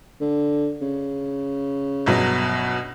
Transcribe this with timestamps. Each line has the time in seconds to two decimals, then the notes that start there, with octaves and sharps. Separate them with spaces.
0.21 D3
0.81 C#3
2.06 G1 B2 F#3